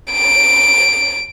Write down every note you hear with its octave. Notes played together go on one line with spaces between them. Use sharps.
D7